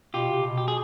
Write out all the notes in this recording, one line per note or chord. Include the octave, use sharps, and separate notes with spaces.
B2 F4 G4
C3
B2
G4
G#4